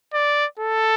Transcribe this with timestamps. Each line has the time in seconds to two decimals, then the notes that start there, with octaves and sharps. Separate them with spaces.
0.14 D5
0.59 A4